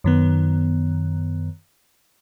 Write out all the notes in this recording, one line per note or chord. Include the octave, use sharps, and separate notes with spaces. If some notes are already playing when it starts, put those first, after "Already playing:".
F#2 D#3 B3